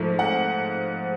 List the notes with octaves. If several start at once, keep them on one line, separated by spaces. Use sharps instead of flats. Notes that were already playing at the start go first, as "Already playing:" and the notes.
Already playing: G#2 F3 A3
F#5